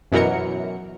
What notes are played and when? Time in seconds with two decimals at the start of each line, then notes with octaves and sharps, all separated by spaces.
0.12 F#2 B2 E3 F#3 A#4 C#7